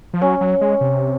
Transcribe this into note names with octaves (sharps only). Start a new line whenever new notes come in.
F3
F#3 C#4
F#3
G#3
C3